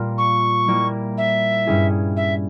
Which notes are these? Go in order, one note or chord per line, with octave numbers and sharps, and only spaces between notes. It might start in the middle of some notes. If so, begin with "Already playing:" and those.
Already playing: A#2 G3 A#3 F4
C#6
G3 A#3 E4
E5
G2 G3 C#4 E4 G#4
E5